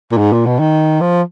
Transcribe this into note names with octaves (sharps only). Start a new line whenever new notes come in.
A#2
G#2
A#2
B2
D#3
F3